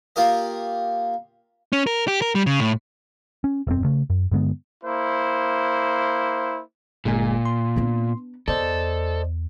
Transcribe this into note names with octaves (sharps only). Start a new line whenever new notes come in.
A#3 F4 G4 A#4 D#5
C#4
A#4
G4
A#4
G3
C#3
A2
C#4
E1 F#2 C4
C#3 A3
F#2
G2 D3 G#3 B3
A#3 E4 C5
G1 A#2 G#3 G#5
C6
B3 D4
E2 A4 C5 D5 D#5